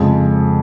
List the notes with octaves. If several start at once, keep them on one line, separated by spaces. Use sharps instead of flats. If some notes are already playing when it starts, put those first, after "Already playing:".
Already playing: F2 C#3 G#3